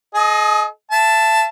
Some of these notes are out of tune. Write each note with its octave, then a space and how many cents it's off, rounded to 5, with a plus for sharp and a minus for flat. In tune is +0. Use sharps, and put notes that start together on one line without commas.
G#4 +40 D#5 +0
E5 +35 A5 +0